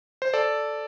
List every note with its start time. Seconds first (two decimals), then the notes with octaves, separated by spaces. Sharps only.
0.22 C5
0.33 A4 D5